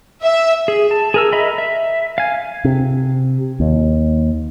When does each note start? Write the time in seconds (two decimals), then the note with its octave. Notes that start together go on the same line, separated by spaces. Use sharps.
0.23 E5
0.68 G#4
0.91 A5
1.14 G#4 A#4 E6
1.32 D#5 E5 A#5 B5
1.58 E5
2.18 F5 G#5
2.65 C3
3.60 D#2